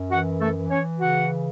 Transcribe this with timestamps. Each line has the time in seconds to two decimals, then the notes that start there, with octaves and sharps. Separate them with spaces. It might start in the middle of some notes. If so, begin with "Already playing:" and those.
Already playing: F#2
0.10 E3 F#4 F#5
0.39 A3 A4
0.55 E3
0.69 C#4 C#5
0.99 C#3 F#4 F#5